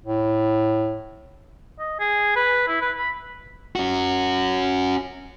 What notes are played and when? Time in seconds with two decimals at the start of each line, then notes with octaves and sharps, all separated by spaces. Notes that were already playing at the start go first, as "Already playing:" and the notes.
0.05 A2
1.79 D#5
2.00 G#4
2.36 B4
2.68 E4
2.82 B4
2.97 B5
3.76 C#4 F#4